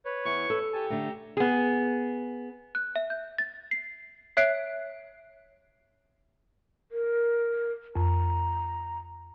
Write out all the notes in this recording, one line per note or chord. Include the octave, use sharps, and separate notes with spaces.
B4 C#5
E2 C#6
A4
G4 G#5 A5
D3 A3 A#5
B3 G#4
F#6
E5
G6
A6
C7
C#5 E5 F#6 C7 D7
A#4
F2 A#5